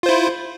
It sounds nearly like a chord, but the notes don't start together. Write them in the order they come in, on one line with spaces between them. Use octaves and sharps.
F4 C5 E4